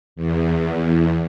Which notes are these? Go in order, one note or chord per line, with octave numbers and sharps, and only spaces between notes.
E2